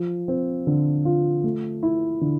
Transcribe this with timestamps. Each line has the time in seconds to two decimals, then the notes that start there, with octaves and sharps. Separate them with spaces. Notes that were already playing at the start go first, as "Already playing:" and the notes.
Already playing: F3
0.28 C4
0.67 D3
1.05 F4
1.44 A3
1.83 E4
2.21 D3